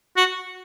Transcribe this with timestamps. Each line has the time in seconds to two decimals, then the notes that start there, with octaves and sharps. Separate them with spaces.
0.17 F#4